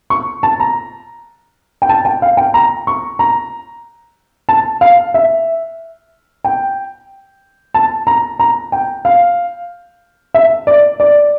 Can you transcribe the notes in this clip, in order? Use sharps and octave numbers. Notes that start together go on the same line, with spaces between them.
C#6
A5
A#5
G5
A5
G5
F5
G5
A#5
C#6
A#5
A5
F5
E5
G5
A5
A#5
A#5
G5
F5
E5
D5
D5